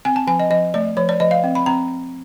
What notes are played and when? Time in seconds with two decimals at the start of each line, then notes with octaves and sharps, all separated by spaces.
0.05 C4 G#5
0.16 A5
0.27 F3 G#5
0.39 D#5
0.50 F3 D#5
0.74 A3 D5
0.97 F3 C#5
1.09 D5
1.20 F3 D#5
1.31 F5
1.44 C4
1.55 B5
1.66 C4 A#5